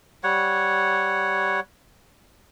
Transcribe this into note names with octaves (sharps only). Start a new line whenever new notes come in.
G3 C#5 F#5